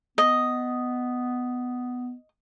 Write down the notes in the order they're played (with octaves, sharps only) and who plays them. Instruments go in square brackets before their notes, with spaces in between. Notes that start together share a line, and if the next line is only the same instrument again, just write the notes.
[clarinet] B3 [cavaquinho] D#5